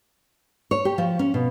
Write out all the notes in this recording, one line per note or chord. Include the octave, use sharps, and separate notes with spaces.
C#5
G4
F3
C#4
B2